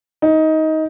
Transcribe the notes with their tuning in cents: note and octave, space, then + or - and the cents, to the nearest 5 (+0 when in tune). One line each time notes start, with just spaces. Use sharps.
D#4 +20